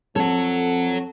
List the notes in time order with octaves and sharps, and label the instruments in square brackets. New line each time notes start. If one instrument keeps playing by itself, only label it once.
[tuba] F2 [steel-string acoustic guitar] A4 [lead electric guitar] C#5 F#5